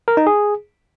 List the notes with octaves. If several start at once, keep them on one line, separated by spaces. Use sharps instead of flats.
A#4
D#4
G#4